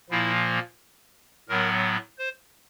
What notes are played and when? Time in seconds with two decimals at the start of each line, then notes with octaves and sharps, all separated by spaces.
0.10 A#2 F3 A#3 E4
1.48 A2 F#3 B3 A#4
2.18 C5